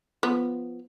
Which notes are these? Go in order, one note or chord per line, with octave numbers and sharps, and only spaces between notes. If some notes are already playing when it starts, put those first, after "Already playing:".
F3 B3